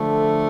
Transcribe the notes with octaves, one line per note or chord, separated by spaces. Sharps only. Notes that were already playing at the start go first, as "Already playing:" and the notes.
Already playing: D3 F3 A3